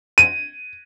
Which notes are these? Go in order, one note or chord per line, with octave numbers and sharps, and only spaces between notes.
D#7